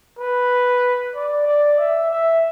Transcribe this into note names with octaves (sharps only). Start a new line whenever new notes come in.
B4
D5
D5
E5
E5